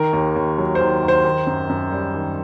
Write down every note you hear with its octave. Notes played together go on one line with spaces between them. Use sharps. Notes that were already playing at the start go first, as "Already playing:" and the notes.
Already playing: D#3 A#4
D#2
D#2
F#3
C5
D#3
D#2
C5
D#3
F#2
F#2
G3
D#3